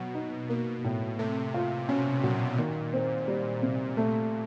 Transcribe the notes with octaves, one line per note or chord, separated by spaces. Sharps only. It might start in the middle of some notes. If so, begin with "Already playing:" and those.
Already playing: B2 F#3
D#4
B2 A#3
A2
C3 A3
F4
B2 C#4
A#2 F#3
D#3
C4
G3
C3
A#2 A3